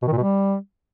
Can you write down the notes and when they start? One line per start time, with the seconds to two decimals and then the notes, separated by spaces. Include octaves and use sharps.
0.02 B2
0.07 D#3
0.13 A#2
0.18 B2
0.23 G3